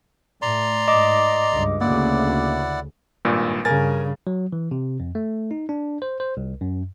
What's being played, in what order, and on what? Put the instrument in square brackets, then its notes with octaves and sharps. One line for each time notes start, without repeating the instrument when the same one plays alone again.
[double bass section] A2 [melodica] D5 A#5 C6
[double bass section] G#2 [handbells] D#5 D6
[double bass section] C#2 G2
[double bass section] D2 C#3 [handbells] A#3 D6 [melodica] E4 D5 F#5
[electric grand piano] G#1 G2 A#2
[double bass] G2 C#3 [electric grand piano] A#4 G#5 A6
[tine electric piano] F#3
E3
C3
F2
A3
D#4
D4
C5
C5
C2
F#2